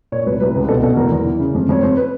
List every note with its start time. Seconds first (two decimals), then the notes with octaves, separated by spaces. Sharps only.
0.12 A#2 C#5
0.27 C2 B4
0.40 C2 B4
0.54 C#2 B4
0.69 B2 A4
0.83 B2 A4
0.97 E2 A#4
1.12 E2
1.26 E3
1.40 C#3
1.55 F2
1.69 F2 C#5
1.82 F2 C5
1.97 B4